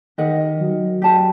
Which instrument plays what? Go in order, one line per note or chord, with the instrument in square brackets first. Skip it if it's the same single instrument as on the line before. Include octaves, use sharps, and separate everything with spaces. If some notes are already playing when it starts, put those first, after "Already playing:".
[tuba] D#3 [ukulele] G4 A#4 D#5 F#5
[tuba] F#3
[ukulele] G4 D5 A5